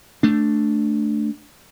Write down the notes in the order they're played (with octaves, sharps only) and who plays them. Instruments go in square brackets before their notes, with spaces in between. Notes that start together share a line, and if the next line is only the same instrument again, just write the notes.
[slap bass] A3 D4